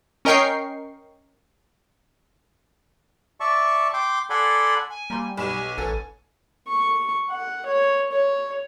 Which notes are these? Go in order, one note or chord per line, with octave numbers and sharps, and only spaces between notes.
C#4 A#4 D#5 G5 C#6 C7
D5 E5 A5 C#6
G5 C6 D6
A4 D5 F#5 G#5 B5 C6
G#5
G3 A#3 A#5 C6
B1 G4 G#5 B5 E7
A1 A4 B4 C#5 F#5
C#6
F#5
C#5
C#5